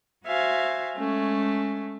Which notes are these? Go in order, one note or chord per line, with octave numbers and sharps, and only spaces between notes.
F#4 C5 E5 F5 G#5
G#3 A3 C#4